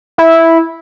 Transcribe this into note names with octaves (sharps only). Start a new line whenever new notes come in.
E4